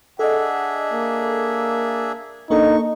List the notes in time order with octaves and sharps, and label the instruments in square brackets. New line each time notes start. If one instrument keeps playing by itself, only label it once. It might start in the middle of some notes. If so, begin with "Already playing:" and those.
[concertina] D4 G#4 E5 [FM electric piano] A4 D#5 [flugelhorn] F#5
[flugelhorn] A#3
[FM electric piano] A#3 D4 A4 [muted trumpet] D#4 [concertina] C#6